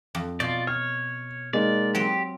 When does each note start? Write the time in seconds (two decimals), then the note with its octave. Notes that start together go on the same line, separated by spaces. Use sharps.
0.15 F2
0.40 B2 F4 D5
0.67 C#5 F6
1.53 G#3 A#3 D#4 D5
1.95 F#3 C4 G4